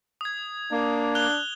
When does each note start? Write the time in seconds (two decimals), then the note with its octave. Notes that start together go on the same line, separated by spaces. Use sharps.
0.21 D#6 G#6
0.71 A#3 D4
1.15 F#6 F7 G7